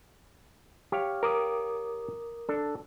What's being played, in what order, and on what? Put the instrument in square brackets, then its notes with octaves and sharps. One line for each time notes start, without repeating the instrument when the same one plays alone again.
[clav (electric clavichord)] G4 C#5 F5
[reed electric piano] A#4 D6 D#6
[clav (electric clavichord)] D4 A4